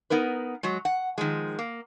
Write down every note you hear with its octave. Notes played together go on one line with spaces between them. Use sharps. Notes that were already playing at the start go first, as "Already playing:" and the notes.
B3 D#4 A#4 B4
F#3 G#3
F#5
D#3 F3 G#3
A#3